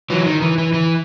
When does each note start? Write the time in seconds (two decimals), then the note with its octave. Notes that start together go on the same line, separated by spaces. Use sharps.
0.10 E3 F#3
0.26 D#3
0.42 E3
0.58 E3
0.73 E3